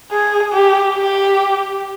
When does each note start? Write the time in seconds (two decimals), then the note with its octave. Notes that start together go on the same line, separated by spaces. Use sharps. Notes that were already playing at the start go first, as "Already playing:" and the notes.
0.11 G#4
0.53 G4
0.94 G4